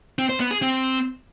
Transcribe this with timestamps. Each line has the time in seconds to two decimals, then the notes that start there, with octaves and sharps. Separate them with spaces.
0.19 C4
0.29 C5
0.40 B3
0.51 G#4
0.62 C4